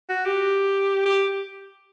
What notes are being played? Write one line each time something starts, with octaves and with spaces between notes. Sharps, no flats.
F#4
G4
G4